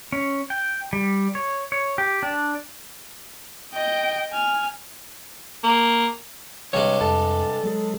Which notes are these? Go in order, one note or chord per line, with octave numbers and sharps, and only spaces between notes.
C#4
G5
G3
C#5
C#5
G4
D4
D#5 G5
G#5 F6
A#3
G2 C3 G#3 C#5
F2 A4
F#3 G#3 G#4